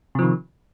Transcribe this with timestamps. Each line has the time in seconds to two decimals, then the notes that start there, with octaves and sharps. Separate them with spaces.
0.15 C3
0.19 F3
0.22 D#3